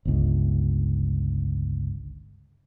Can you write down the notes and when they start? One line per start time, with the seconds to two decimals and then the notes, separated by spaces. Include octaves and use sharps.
0.05 G1 C#2